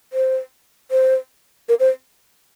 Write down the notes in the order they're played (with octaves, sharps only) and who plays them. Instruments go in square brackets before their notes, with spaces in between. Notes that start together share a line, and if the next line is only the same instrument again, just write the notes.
[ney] C5
C5
A#4
C5